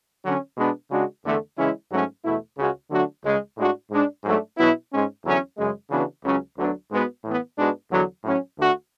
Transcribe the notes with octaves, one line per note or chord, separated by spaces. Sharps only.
D3 F#3 C#4
B2 G#3 B3 D4
C#3 G#3 D4 F#4
E2 D3 A3
C#3 E3 G#3 C#4 E4
G#2 F#3 A3 C#4
E2 B2 A3 E4
C#2 C#3 G#3 C#4 F#4
D3 F#3 A3 D4 F#4
C#2 C#3 G#3
A2 G#3 D4 F#4
G#2 G#3 D4
G#2 F#3 A3 D4
B2 F#3 B3 E4
G#2 G#3 C#4
E2 D3 F#3 C#4 E4
F#2 C#3 G#3
C#3 E3 B3 D4 F#4
C#2 C#3 F#3 C#4
D2 D3 F#3 B3 D4
G#2 G#3 B3 F#4
A2 E3 B3
G#2 G#3 B3 D4 F#4
E2 D3 F#3
A2 F#3 C#4
D2 D3 A3 D4 F#4